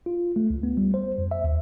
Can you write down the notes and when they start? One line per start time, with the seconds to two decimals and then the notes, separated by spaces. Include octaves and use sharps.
0.06 F4
0.36 A3
0.50 C#2
0.63 B3
0.77 G3
0.94 C5
1.18 F2
1.31 E5
1.44 D#2